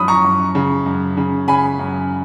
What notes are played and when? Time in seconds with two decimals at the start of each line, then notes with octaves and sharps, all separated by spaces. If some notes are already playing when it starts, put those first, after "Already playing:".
Already playing: F#2 F3 B5 D#6
0.08 A#5 C#6
0.24 F#2
0.55 C#3
0.86 F#2
1.17 C#3
1.48 C#3 G#5 B5
1.79 F#2